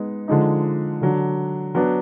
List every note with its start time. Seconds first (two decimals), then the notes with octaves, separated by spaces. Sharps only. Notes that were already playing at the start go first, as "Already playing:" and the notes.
Already playing: G#3 B3 D#4
0.28 D3 F3 G#3 D#4
1.01 D3 F#3 D4
1.75 F#3 B3 D4